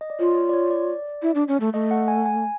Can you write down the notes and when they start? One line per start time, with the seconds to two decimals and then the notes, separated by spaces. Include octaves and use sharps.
0.01 D#5
0.10 D5
0.19 F4 C#5
0.36 C#5
0.49 D5
0.54 C#5
0.71 D5
1.22 E4
1.35 D4
1.48 C#4
1.60 A3
1.73 A3 D#5
1.91 F#5
2.08 G#5
2.25 G#5